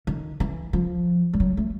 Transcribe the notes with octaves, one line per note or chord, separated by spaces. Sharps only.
D#3
E3
F3
G3
F#3
A3